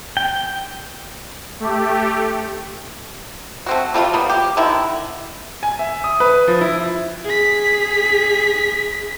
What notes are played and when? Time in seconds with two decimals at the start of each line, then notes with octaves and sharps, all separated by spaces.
0.17 G5
1.60 A3 G4
3.66 A3 C4 F#4
3.94 G3 A3 E4 F4
4.13 G3 A#3 B3
4.29 G4
4.57 D3 D#3 E4
5.63 G#5
5.79 E5
6.04 D#6
6.20 B4
6.48 F3
6.61 E4
7.25 G#4 B6